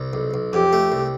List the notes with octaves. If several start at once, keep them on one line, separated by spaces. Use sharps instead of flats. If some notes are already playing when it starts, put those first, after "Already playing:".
Already playing: C2
B1
B1
F2 G4
A3
C2